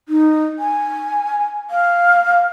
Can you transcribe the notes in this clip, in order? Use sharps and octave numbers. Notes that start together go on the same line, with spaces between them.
D#4
G#5
F5